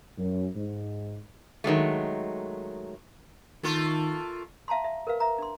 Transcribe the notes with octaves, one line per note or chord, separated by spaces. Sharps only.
F#2
G#2
D#3 F#3 G#3 A3
D#3 A3 A#3 F4
E5 F5 A5 A#5 C6
E5
A#4 B4 F5
E5 A#5
D4 C6